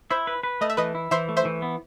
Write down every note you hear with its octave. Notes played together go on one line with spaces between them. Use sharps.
E4 C5 E5
B4
B4
A3 D#5
E5
E3 B4 D#5
E4
E3 C5 E5
A3
C5 E5
E3
B3